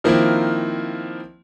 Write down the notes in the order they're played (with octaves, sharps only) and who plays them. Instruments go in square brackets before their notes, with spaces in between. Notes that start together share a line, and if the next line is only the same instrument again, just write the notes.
[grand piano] D#3 F3 A#3 C4 E4